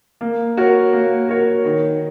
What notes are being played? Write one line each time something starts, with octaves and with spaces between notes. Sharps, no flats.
A#3
F#4 A#4 C#5
A#3
F#4 A#4 C#5
D#3